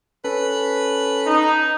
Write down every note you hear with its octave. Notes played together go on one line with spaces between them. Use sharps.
C#4 A4 B4
D#4